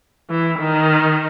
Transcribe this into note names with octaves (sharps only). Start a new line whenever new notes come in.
E3
D#3